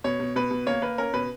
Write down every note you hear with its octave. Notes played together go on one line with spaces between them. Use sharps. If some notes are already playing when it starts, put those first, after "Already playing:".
B2 C#5
B2
B2 B4
B2
A#3 C#5
A#3 B4
C#4 A#4
B2 B4